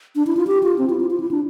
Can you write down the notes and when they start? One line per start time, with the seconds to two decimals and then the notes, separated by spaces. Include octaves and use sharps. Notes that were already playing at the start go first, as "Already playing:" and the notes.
0.16 D4
0.27 E4
0.37 F4
0.47 G4
0.63 F4
0.78 C4
0.90 E4
1.00 F4
1.10 F4
1.20 E4
1.31 D4